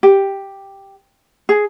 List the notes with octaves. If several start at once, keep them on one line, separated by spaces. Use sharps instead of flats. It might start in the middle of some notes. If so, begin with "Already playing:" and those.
G4
G#4